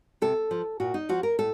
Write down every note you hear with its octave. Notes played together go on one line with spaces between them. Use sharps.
C3 A4
F3
A#2 F#4
D#4
F3 F#4
A#4
A2 A4